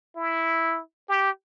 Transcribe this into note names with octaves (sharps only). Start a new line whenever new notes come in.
E4
G4